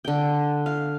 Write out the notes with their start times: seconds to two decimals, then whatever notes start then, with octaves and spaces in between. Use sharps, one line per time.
0.05 D3 G5
0.66 F5